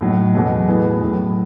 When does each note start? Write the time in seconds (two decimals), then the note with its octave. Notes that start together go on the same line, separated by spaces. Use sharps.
0.01 A2 F#3 A3 D#4
0.34 E2 B2 F#3 A3
0.68 A2 E3 B3
1.01 A2 F#3 B3